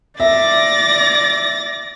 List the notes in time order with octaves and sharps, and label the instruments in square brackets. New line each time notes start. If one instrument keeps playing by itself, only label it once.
[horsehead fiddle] D5 [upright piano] E5 [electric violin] A6 A#6